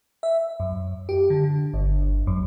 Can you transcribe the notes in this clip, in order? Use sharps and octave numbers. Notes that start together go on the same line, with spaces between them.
E5
F#2
G4
D3
G1
F#2